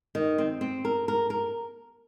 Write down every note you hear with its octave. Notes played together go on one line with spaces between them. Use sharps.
D#3
C4
C4
A#4
A#4
A#4